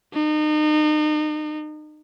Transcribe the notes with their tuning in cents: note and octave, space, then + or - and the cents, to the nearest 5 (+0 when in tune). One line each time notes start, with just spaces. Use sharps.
D#4 -35